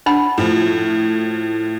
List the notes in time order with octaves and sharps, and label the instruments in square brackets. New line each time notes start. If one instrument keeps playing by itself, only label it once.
[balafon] D4 F#5 B5
[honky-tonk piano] A2 F3